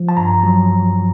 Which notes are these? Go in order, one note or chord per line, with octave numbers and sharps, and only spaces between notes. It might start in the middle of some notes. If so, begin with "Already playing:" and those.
Already playing: F3
A5
G2 A#5
F#3